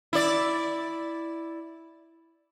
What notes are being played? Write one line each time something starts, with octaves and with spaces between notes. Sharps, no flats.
E4 D5